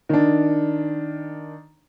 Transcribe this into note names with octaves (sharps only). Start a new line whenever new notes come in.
D#3 D4